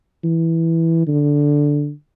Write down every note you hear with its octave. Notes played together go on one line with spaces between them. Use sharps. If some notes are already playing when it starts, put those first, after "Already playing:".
E3
D3